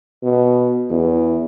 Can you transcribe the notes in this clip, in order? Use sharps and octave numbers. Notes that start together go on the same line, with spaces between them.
B2
E2